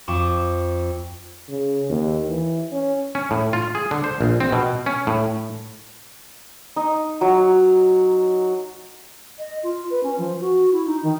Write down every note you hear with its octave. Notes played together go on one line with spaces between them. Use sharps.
F2 C#6 D6 E7
C#3
D#2
E3
C#4
C#4
A2
F4
G#4
D3
C5
A#1
C4
B2
C#4
A2
D#4
F#3
D#5
F4
B4
C#4
F3
F#4
E4
D#4
D#3